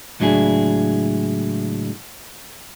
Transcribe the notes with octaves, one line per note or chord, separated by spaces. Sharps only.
C#2 A2 F#3 D4 E4 G#4